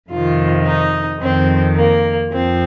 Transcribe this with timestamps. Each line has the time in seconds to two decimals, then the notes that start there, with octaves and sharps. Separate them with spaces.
0.10 F2 C3 D#3 F4
0.66 D#4
1.20 F2 D#3 C4
1.76 A#3
2.31 F2 F3 C4